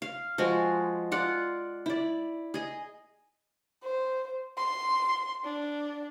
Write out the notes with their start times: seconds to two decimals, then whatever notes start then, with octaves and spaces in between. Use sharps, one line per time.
0.02 F5
0.38 F3 G#3 F#4 G#4
1.12 F4 D5 F#5
1.86 E4 D5
2.54 G#4 D#5
3.83 C5
4.57 C6
5.44 D4